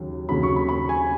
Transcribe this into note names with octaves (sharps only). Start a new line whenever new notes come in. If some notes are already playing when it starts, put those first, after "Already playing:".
Already playing: D#2 C#3 F#3
D#2 C#3 F#3 B5
C#6
B5
B5
G#5